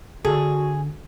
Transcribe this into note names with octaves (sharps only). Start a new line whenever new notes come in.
D3 F#4 G#4 A4